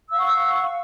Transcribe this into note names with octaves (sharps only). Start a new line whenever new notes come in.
F5 F#5 C#6 E6